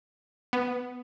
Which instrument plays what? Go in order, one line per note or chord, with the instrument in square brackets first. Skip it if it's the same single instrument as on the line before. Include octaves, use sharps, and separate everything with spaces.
[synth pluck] B3